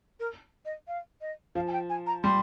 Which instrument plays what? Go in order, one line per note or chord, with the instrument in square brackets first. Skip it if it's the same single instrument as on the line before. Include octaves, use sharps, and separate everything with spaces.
[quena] A#4
D#5
F5
D#5
[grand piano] F3 [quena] F5
[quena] G#5
G5
G#5
A#5
[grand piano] G3 [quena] C6